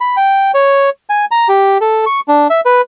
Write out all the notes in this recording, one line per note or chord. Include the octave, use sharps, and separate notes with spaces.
B5
G5
C#5
G#5
A#5
G4
A4
C#6
D4
E5
B4